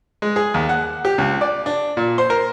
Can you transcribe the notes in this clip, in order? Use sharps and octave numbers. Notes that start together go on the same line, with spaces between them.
G#3
G#4
D#2
F#5
G4
C#2
D5
D4
A#2
C5
A#4